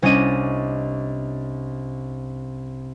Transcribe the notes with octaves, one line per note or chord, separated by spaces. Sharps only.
C2 C#4 D4 D#5 D#7